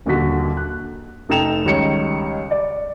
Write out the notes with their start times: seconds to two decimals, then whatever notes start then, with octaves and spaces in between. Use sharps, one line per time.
0.05 D#1 D#2 A#2 D3 F#4 B6
0.57 F#6
1.29 F1 D#4 A4 G5 E7 F7
1.65 C#2 D#3 G3 C#5 C#7
2.51 D5